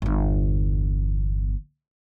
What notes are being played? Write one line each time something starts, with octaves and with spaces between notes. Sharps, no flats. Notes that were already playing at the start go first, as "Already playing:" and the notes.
G1 E2